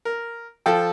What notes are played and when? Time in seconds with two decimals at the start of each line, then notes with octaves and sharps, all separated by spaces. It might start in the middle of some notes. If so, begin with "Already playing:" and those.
0.05 A#4
0.66 F3 A4 G5